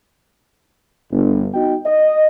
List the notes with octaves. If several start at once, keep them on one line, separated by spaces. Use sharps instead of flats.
G1
B3 D#4 F#4 D#5 G5
D#5